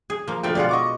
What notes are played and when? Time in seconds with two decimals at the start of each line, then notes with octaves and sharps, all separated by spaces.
0.10 G#4
0.28 F3 A#3
0.43 B2 D3 F3 A3 G5
0.55 B2 G#3 F4 D5 F5 F#5
0.69 D#5 C#6 D6